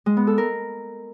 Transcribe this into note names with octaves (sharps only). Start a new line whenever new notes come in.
G#3
B3
A4
A#4